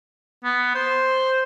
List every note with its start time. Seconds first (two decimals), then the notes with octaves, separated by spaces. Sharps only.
0.44 B3
0.75 C5